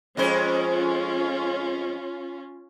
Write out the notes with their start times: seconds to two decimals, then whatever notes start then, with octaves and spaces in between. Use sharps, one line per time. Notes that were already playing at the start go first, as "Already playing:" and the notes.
0.17 F2 G#3 C#4 F4 C5